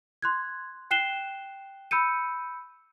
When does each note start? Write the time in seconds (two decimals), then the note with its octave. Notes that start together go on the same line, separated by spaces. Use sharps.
0.22 C6 F#6 G#6
0.91 G5 F#6 C7 E7 G7
1.91 B5 E6 G6 C#7 D#7